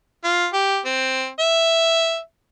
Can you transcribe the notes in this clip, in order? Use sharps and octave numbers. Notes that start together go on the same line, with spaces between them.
F4
G4
C4
E5